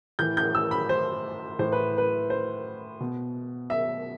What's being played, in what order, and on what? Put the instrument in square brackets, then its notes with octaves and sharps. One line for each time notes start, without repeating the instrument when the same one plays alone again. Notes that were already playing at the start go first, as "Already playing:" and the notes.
[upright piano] A2 E3 G6
G6
E6
B5
C5
A2 E3 C5
B4
B4
C5
B2
E5